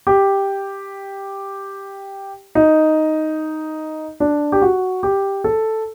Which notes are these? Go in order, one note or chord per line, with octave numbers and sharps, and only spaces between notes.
G4
D#4
D4
G4
F#4
G4
A4